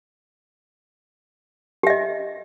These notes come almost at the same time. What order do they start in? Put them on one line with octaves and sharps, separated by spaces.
G4 E5 D#5